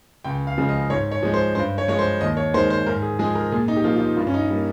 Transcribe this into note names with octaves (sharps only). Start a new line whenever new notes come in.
C#2 G5
F5
C#3 F3 G#3
D#5
G#2 C#5
C#5
F3 G#3
C5
G2 C5
C#5
F3 G#3 C#5
C5
D#2 D#5
C#5
D#3 G#3 C5
C5
G#2 A#4
G#4
F3 G#3 G#4
A#4
A#2 G#4
D#4
G4
F3 A#3 F4
F4
D#4
G2 F4
C#4
D#4
G3 A#3